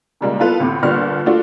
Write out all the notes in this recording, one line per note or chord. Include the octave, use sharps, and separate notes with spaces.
A#2 C#3 G3 G#3 A#3
B3 E4 F4 A4 B4 F5
D2 A2 C3
G1 A#2 D3 G3 F6
A3 D4 F4 F#4